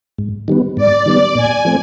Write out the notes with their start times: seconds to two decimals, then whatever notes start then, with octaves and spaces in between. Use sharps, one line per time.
0.18 G#2
0.48 D#3 G3 B3
0.77 G#2 D5
1.06 D#3 G3 B3
1.35 A#2 G#5
1.65 F3 A3 C4